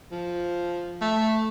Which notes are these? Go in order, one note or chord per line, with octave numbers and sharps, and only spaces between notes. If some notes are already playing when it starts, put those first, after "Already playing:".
F3
A3